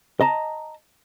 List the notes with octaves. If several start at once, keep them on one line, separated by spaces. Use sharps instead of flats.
D#5 A5 A#5